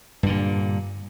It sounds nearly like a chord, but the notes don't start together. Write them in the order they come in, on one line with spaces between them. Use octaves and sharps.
G2 D3 A#2